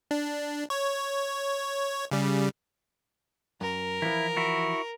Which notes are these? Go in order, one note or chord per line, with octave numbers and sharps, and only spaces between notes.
D4
C#5
C#3 G3
F#2 A#4
E3 F3 E4
E4 F#4